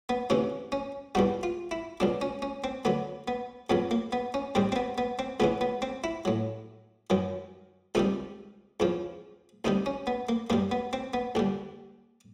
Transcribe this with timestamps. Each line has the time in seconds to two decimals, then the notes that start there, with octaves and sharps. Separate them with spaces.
0.09 B3
0.30 D2 C3 E3 C#4
0.72 C#4
1.15 E2 B2 G3 F#4
1.43 F4
1.71 E4
2.00 C#2 B2 F#3 D4
2.22 C#4
2.42 C#4
2.64 C4
2.85 D2 D3 F#3 B3
3.28 B3
3.70 F2 C#3 F#3 B3
3.91 A#3
4.12 B3
4.34 C#4
4.55 G#2 D#3 G3 C4
4.72 C4
4.76 B3
4.98 B3
5.19 C4
5.40 C#2 C#3 E3 B3
5.61 B3
5.82 C4
6.04 E4
6.25 A2 F#3
7.10 F#2 D#3 F#3
7.95 C#2 C3 D#3 G3 D#4
8.80 E2 C#3 F3
9.65 D2 C3 D#3 G3 D#4
9.86 C#4
10.07 B3
10.29 A#3
10.50 F#2 D#3 G3 A#3
10.71 B3
10.93 C4
11.14 B3
11.35 D#2 D3 G3